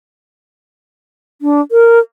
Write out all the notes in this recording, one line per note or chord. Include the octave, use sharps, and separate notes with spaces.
D4
A#4